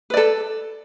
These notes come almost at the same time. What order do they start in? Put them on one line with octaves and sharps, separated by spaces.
B4 D5 A4